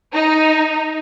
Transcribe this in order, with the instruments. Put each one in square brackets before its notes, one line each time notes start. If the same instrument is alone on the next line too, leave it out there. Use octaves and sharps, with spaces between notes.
[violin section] D#4